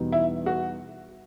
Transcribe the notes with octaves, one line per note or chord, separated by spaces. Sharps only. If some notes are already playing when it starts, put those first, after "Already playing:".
Already playing: E2 B2 G3 B3 D#4
E4
F#4